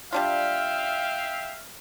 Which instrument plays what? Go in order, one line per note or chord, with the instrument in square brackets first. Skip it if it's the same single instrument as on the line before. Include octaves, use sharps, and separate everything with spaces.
[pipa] G3 D4 F4 [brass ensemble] E5 F5 [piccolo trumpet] G5